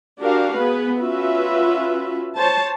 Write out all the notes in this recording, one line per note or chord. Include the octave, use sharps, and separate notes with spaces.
D4 F#4 G4 A#4 F5
B3 G#4 B4
C#4 F4 F#4 B4 E5
C5 C#5 A5